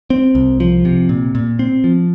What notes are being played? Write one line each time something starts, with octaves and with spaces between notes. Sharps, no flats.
C4
C2
F3
C3
A#2
A#2
C4
F3